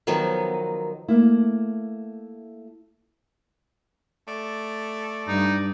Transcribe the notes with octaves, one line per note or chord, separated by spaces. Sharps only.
D#3 F3 F#3 B3
A3 A#3 E4
A3 D5
G2 D#4